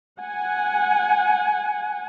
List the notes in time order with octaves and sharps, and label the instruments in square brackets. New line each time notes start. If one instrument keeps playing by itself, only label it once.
[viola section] F#5 G#5